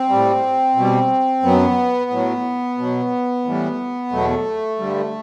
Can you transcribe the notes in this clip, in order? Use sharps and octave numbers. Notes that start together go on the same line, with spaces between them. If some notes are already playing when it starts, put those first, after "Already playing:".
Already playing: C4
A2 G3
B2 G3
F#2 F#3 B3
A2 F#3
B2 F#3
A2 E3 G3
E2 B2 F#3 A3
G2 D3 G3